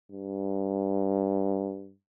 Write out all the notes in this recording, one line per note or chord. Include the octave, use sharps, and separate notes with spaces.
G2